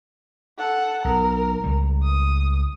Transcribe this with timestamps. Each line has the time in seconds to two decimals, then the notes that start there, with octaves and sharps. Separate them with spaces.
0.58 A4 F#5
1.05 B1 A#4
1.64 C#2 G3
2.03 D#6